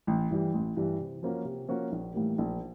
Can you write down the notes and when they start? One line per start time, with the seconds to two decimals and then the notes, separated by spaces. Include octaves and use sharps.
0.07 A1
0.31 G2 E3 G3
0.53 A1
0.76 G2 E3 G3
1.00 C3
1.23 F3 A#3 C#4 F#4
1.45 C3
1.68 F3 A#3 C#4 F#4
1.92 A#1
2.14 A2 E3 G3 A#3
2.38 A#1